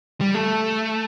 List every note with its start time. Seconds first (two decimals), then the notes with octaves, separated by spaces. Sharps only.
0.21 G3
0.35 A3